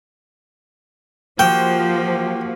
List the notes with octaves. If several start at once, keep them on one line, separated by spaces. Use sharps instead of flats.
F3 A#3 F#4 G4 G5